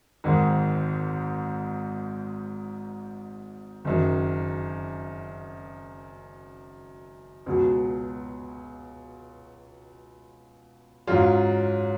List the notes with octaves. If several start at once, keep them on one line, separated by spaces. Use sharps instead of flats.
G#1 G#2 D#3
F#1 F#2 D#3
C#2 B2 F#3
G#2 F#3 C#4 F4